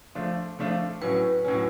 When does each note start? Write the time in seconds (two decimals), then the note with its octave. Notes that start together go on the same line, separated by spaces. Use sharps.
0.15 F3 A3 D4 F4
0.59 F3 A3 D4 F4
1.01 A2 F#3 C#4 B4
1.45 A2 F#3 C#4